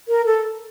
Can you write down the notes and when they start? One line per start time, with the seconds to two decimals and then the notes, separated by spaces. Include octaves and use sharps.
0.08 A#4
0.26 A4